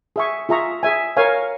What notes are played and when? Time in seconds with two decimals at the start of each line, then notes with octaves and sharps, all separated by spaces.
0.16 G#4 E5 G#5 C#6
0.49 F4 G#4 E5 A#5 C#6
0.83 G#4 E5 G#5
1.17 A#4 C#5 F5 G#5